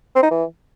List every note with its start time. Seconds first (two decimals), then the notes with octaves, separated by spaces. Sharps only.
0.15 C4
0.23 D#4
0.31 E3